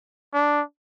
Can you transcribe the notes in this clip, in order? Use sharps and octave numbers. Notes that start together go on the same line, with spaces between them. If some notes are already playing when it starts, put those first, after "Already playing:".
D4